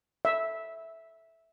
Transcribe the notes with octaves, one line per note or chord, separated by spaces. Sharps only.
E5